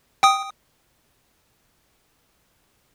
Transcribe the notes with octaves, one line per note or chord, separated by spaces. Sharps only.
G5 D#6